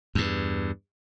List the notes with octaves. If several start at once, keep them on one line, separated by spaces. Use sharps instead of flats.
E2 G2